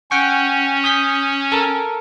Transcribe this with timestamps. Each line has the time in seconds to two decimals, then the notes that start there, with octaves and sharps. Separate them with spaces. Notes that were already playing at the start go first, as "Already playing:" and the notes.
0.11 C#4 F#5 G5 C#6
0.84 D#6 G6 B6
1.52 A4 A#4